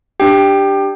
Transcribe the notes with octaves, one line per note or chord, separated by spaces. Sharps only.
D4 G4 G5